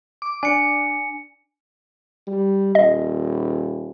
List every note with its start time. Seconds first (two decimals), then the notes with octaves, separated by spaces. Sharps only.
0.22 D6
0.43 D4 G#5 C#7
2.27 G3
2.75 D#1 D#5